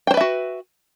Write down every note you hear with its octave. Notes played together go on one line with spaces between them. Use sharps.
F#4 B4 C5 E5 G5